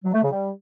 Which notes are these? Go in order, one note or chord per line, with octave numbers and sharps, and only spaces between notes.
F#3
A3
C#3
G3